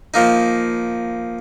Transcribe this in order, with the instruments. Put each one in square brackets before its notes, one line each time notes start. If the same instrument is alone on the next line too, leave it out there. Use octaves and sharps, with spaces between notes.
[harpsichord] F3 A#3 D#4